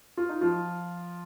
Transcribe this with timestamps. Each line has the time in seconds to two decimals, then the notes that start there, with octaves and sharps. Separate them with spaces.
0.17 F4
0.29 D#4
0.41 F3 F4